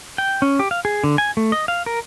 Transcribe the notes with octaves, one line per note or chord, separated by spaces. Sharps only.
G5
C#4
G4
F5
G#4
D3
G#5
A3
D#5
F5
A#4